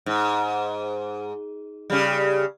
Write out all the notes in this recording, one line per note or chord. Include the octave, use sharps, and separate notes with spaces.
G#2
C#3 G3